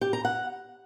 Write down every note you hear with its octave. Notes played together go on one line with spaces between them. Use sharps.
G4
A#5
F#5